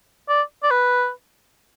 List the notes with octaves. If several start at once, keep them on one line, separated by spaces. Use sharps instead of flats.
D5
D5
B4